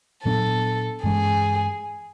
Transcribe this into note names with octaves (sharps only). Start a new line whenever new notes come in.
A#2 F#3 B3 D4 A4
G2 E3 G#3 C#4 G#4